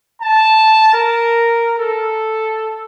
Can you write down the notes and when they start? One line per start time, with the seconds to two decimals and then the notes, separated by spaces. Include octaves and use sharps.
0.22 A5
0.94 A#4
1.78 A4